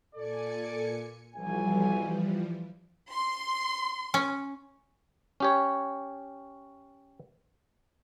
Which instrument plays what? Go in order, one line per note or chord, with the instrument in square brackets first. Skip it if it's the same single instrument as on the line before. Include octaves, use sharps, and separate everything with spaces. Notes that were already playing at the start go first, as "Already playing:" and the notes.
[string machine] A#2 G#5 C#7 [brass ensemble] A4 D5
[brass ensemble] B1 G#5 [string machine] E3 F3 G3
[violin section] C6
[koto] C#4
[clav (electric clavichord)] C#4 G4 C#5